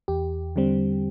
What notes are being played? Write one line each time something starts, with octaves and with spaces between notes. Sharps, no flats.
E2 G4
D3 G3 C4